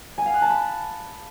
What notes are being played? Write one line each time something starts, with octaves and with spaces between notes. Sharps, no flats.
G#5
F5
F#6
A5
B5